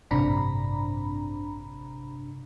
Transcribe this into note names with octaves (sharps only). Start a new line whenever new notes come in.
A1 G2 C3 D4 A#5 B5